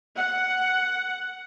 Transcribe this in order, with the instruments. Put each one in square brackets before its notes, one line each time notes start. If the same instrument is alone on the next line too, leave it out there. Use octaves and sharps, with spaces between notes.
[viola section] F#5